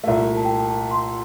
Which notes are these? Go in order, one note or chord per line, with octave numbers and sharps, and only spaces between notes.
C2 A#2 A3 F5
A5
G5
A5
A5
C6